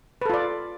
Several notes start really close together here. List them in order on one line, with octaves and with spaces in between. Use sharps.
B4 A4 F4 D5